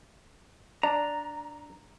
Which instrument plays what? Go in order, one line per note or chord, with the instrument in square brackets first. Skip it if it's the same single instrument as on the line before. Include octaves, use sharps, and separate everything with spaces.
[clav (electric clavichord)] D4 [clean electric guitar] A#5